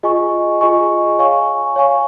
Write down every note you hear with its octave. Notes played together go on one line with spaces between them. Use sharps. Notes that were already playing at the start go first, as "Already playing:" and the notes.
F4 G#4 D#5 G#5 C#6
F4 G#4 D#5 G#5 C#6
C#5 F5 G#5 C#6
C#5 F5 G#5 C#6